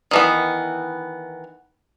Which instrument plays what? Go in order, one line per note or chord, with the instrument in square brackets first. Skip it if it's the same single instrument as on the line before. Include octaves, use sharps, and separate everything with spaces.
[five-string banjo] D#3 E3 B3